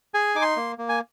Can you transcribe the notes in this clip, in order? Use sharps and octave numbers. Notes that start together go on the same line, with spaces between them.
G#4 G#5
D#4 D6
C6
A#3
A#3
G#5